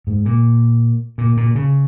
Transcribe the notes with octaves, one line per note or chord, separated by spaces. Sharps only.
G#2
A#2
A#2
A#2
C#3